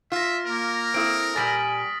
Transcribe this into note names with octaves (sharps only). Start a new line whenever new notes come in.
F4 E5 F6 A#6
A#3 A#4
C4 E4 A4 D#6 D7
A#2 G3 G#5 A6 B6 F#7